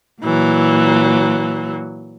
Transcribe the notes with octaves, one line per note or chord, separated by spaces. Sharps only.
A#2 E3 F#3